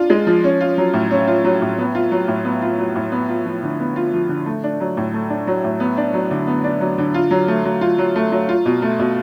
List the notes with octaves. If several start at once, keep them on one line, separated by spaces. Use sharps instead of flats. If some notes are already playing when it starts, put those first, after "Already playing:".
Already playing: D4 F4
G#3
F3
C#4
F4
F#3
A2
C#4
F4
F#3
A2
B3
F4
F#3
A2
B3
F4
F#3
A2
B3
F4
F3
D3
B3
F4
F3
D3
A3
D4
F#3
A2
A3
D4
F#3
A2
B3
D4
F#3
D3
B3
D4
F#3
D3
F4
F#3
A3
F#3
F4
F#3
A3
F#3
F4
B2
A3
B2